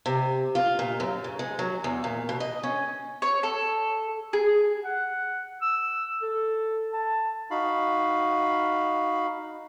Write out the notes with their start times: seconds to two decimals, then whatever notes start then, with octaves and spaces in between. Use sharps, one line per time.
0.06 C3
0.55 F4
0.79 A#2
1.00 F#2
1.24 C#3
1.39 G#3
1.59 F#3
1.84 E2
2.04 A#2
2.29 B2
2.40 D#5
2.63 C#4
3.22 C#5
3.43 A4
4.33 G#4
4.84 F#5
5.62 E6
6.22 A4
6.93 A5
7.51 D#4 F#4 F5 B5